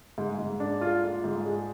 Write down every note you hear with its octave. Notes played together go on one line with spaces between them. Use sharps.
G#2
G#2
D4
F4
F4
G#2
G#3